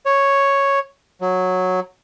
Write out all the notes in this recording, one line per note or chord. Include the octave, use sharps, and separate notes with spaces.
C#5
F#3